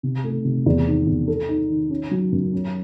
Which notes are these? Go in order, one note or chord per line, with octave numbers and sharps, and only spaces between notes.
C3
A3
C3
E2
D#3
E2
A4
D#4
D#3
C#4
F#3
F#2
C#4